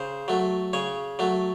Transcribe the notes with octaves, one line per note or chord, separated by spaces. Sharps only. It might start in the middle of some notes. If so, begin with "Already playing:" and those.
Already playing: C#3 C5
F#3 A3
C#3 C#5
F#3 A3